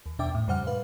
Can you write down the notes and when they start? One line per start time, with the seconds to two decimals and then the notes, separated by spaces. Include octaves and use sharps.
0.06 D#2
0.19 E2 B2 D4 E5 G5 D6
0.35 A2
0.48 F2 C#3 G3 C5 F#5 F6
0.67 B4 F5